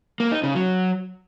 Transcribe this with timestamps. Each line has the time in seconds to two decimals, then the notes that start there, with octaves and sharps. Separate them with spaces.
0.20 A#3
0.32 D#4
0.43 C#3
0.55 F#3